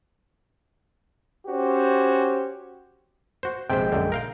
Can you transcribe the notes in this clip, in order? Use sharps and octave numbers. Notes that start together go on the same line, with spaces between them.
C#4 F#4 G4 C5
F#4 C5
A#1 C3 G#3 C5 G5
F#2 D3
A#4 F5 G5